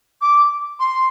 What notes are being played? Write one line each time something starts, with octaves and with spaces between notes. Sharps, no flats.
D6
C6